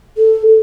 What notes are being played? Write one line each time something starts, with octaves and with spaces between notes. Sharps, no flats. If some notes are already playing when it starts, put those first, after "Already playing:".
A4
A4